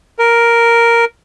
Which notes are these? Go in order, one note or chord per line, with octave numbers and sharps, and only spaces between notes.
A#4